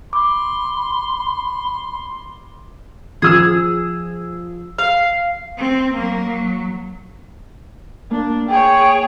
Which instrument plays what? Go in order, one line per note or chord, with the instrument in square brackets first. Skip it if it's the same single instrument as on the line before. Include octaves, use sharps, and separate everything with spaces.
[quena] B5 [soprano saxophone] C6 [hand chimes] D6
[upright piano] F3 E6 [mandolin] G#4
[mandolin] F5
[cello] C4
F#3 A#3
F#3
[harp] A#3 [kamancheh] D4
[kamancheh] G#4 C#5 [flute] G5